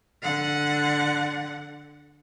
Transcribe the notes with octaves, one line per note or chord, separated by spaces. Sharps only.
D3 F#5